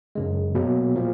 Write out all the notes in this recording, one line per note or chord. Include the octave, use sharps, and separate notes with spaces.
F#2 C#3 G#3
B2 F#3 A#3
A#2 F3 A#3